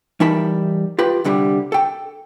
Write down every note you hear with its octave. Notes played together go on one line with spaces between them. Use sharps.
E3 G3 D#4 A#4 A5 B5
F4 G4 B4
C2 D3 G3 G4
A4 G5